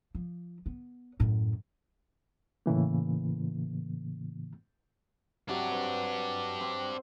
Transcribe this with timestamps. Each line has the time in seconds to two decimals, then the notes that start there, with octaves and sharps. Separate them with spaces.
0.15 F3
0.66 B3
1.20 F#2 A2
2.66 A2 C#3 E3 A#3
5.49 C3 F#3 D4 G4
5.72 B4
6.60 C4 C5